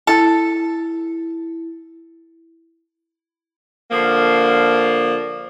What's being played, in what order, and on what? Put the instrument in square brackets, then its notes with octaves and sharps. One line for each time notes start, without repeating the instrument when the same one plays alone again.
[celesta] E4 [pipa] A4
[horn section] D3 F3 A#3